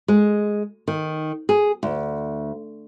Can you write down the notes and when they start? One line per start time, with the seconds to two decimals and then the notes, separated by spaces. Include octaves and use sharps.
0.08 G#3
0.88 D#3
1.49 G#4
1.83 D2